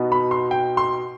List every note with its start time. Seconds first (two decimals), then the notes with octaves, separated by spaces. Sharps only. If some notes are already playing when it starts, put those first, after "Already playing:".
Already playing: B2 B3 D#4
0.12 B5
0.31 C6
0.51 G5
0.77 C6